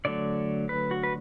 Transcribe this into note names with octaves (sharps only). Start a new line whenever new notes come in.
D3 F#3 A3 D5
B4
F#4
B4